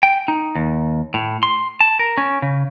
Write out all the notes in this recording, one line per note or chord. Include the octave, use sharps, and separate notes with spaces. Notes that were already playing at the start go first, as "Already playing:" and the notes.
G5
D#4
D#2
A2
C6
A5
A#4
C#4
C#3